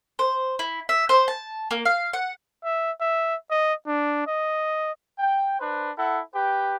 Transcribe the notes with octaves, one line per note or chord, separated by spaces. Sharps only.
C5
E4
E5
C5
A5
A#3
F5
F#5
E5
E5
D#5
D4
D#5
G5
D4 B4 C5
E4 A4 F#5
G4 B4 G5